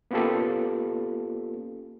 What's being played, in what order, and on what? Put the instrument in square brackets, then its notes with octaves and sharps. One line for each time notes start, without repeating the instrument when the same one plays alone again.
[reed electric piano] A#3 B3 C#4 F4 G4 A4